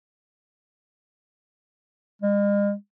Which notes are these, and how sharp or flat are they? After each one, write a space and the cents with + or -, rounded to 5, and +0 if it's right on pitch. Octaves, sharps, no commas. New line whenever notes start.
G#3 -45